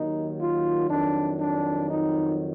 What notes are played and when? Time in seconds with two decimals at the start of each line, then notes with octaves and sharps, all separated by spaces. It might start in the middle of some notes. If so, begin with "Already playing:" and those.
Already playing: D#2 D#3 F#3 D#4
0.40 F4
0.89 F2 D#3 F#3 D4
1.40 D4
1.89 D#4